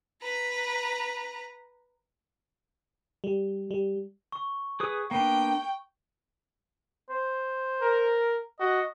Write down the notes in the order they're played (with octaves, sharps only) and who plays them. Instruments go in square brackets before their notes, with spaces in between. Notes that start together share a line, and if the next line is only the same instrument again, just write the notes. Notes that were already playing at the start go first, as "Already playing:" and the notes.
[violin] B4 A#5
[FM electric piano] G3
G3
[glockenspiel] C#6
[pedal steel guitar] G#4 B4 D#6
[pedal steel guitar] A#3 B3 D4 [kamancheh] G5
[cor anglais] C5
[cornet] A#4
[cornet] F#4 [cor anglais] D#5